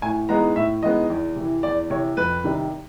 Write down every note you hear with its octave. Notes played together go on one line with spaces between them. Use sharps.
A2 G#5
E3 G#3 B3 D#4 A#5
A2 E5
E3 G#3 B3 D#4 D#5
E2
C3 E3
E2 D5
C3 E3 C#5
F2 B4
C3 D#3 G3